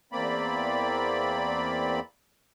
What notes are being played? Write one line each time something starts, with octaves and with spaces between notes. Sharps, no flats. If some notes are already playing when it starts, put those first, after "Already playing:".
E2 A#3 C4 D5 B5